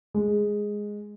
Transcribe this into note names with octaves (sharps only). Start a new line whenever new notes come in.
G#3